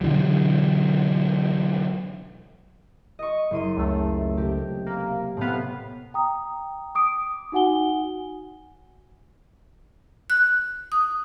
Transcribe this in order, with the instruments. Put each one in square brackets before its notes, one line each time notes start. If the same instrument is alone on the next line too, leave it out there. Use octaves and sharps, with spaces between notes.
[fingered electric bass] B2 D3 E3 F#3
[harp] D#5 C#6
F#1 C6 D#7
[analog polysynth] C#2 A3
[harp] C3 G4
[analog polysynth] A#3
[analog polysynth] A2 B3 [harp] C4 F5
[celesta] G5 A#5 D#6
D6 D#6 D7
D#4 F#4 F#5 G#5 G7
[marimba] F#6
D#6